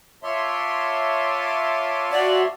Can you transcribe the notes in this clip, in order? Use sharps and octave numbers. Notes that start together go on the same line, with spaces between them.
F4 C#5 E5 A5 C6 D6
F#4 D5